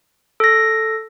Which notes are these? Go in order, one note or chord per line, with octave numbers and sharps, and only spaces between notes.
A4 A#6